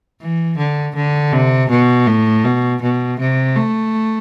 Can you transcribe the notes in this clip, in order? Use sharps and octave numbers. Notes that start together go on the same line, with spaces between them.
E3
D3
D3
C3
B2
A2
B2
B2
C3
A3